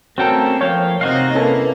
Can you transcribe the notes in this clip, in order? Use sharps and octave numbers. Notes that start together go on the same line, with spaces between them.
A3 A#3 C4 C#4 F#4 A4 G5 A#5
F3 C#5 F5 G5
C3 C4 D#4 F#4 D#5 F5
A#3 C#4 E4 A4 B4